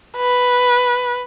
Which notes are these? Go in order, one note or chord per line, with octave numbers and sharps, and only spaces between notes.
B4